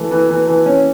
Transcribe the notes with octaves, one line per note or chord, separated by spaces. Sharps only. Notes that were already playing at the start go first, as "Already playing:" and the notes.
Already playing: E3 A3 A4
E3
E3
E3
C#4